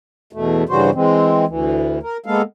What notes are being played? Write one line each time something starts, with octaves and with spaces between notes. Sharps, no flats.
E2 B2 A3
G2 C#3 E3 G3 F#4 C5
E3 G#3 C4
D2 E3
A#4
G#3 A#3 B3 A4 F5